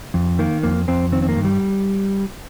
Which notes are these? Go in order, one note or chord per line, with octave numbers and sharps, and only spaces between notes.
F2
D#3 A#3
F2 A#3
F2 C4
D#3 C4
C4
A#3
G2
G3